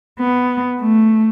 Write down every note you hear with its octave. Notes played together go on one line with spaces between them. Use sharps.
B3
A3